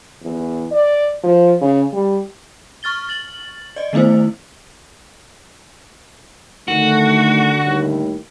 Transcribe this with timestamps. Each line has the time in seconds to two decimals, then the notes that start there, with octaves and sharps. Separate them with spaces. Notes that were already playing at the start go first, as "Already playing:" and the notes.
0.23 E2
0.72 D5
1.23 F3
1.61 C#3
1.93 G3
2.83 C#6 F6 A6 G7
3.09 A6 F#7
3.76 D5 D#5
3.93 D#3 A3 B3 E4 C5
6.68 D3 D#3 A3 F#4
7.63 D#2 A2 G3